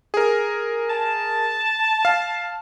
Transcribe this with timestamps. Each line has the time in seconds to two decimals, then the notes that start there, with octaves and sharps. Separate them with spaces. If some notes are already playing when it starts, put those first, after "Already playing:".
0.14 G#4 A#4
0.90 A5
2.05 F5